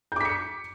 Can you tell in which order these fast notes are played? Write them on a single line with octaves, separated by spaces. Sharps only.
G6 D6 B6 C#7